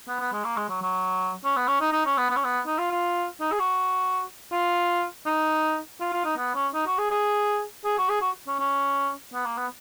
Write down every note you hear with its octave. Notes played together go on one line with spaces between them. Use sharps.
B3
B3
G#3
A#3
G#3
F#3
F#3
C#4
B3
C#4
D#4
D#4
C#4
B3
B3
C#4
B3
D#4
F4
F4
D#4
G#4
F#4
F4
D#4
F4
F4
D#4
B3
C#4
D#4
F#4
G#4
G#4
G#4
F#4
G#4
F#4
C#4
C#4
B3
A#3
B3